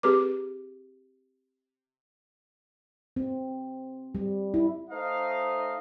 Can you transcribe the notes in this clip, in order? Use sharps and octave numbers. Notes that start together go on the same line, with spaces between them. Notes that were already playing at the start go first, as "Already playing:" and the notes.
C4 G4 G#4 B4 D6
C4
G3
E4
A3 D#4 C5 D#5 F5